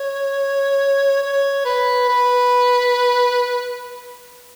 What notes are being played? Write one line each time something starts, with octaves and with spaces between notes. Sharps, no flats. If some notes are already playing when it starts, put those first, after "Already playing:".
Already playing: C#5
C#5
B4
B4